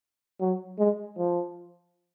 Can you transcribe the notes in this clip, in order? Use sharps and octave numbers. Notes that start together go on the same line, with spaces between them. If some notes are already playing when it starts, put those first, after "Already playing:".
F#3
G#3
F3